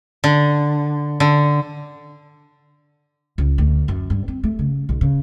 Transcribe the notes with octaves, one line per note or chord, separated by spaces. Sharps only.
D3
D3
C#2
D2
F#2
G2
C4
A3
C#3
B1
C#3